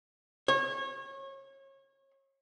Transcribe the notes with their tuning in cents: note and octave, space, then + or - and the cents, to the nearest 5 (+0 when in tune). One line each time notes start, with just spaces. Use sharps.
C#5 -30